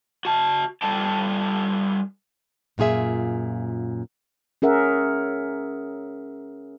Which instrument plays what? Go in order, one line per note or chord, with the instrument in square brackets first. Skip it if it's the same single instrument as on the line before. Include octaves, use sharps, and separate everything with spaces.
[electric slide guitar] F#4 A5
G3 F4 A4 G5 A5
[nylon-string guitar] F#2 A#2 F4 G#4 E5
[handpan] C#4 G#4 A#4 E5 F#5